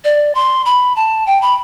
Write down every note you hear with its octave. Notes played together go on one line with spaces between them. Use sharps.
D5
C6
B5
A5
G5
B5